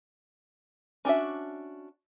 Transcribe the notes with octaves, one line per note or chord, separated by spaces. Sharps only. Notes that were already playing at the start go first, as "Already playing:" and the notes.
C#4 D4 F#4 E5